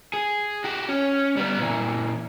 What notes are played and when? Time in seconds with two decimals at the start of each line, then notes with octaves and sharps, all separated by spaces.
0.14 G#4
0.64 F#4 G4
0.89 C#4
1.37 G3 B3
1.59 A#2 E3